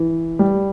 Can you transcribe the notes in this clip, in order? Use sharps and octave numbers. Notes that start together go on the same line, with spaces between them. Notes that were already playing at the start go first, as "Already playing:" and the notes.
Already playing: E3
G3